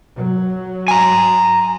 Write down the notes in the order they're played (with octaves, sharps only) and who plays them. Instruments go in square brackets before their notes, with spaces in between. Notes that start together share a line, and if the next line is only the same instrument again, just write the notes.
[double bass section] F#3
[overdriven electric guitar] G#5 A#5